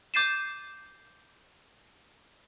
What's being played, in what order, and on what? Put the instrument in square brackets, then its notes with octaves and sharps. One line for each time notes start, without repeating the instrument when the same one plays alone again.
[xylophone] D6 G6 A6 C7 D#7 E7